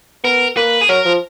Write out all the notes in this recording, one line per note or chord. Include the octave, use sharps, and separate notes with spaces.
B3 A#4
A#3 B4
G#4
F#3 A#4
F3